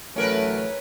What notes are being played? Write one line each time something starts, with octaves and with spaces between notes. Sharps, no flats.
A1 F#3 A3 C#4 A#4 B4